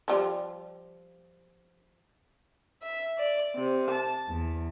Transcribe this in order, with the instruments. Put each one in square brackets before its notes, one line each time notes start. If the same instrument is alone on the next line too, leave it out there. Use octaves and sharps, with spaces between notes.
[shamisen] F3 G3 F4
[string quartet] E5
D5
C3
A5
E2